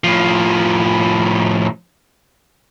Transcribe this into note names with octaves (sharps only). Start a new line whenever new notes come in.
A2 F3